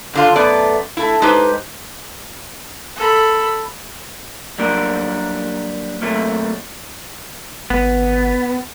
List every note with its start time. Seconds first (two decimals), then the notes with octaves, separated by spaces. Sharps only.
0.13 F#2 D3 F4
0.35 F#2 A3 B3 D5
0.97 A3 E4
1.22 G#3 D#4 G4 B4 C5
2.96 A4 B5
4.58 F#3 G3 A#3 D4 A#4
6.02 C3 F#3 A3 A#3
7.70 G#1 B3